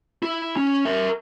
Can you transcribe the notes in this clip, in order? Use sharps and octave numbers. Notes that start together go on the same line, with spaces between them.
E4
C#4
A#4 E5